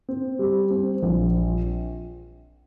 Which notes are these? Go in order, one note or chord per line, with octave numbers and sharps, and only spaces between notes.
C4
G3
C4
A#1